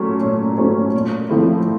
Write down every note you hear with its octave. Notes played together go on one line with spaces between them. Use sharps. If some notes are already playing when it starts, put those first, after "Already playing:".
Already playing: A#2 F#3 A3 C#4
A#2
F#3 A3 C#4
A#2
F3 A3 C4 E4